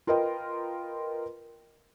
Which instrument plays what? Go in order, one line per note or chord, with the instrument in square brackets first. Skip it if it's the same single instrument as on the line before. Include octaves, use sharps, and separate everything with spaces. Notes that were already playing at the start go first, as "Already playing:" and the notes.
[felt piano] F4 A#4 B4 D#5 G5